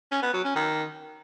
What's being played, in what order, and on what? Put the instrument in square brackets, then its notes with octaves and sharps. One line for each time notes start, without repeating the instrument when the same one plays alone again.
[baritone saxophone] C#4
B3
F#3
C#4
D#3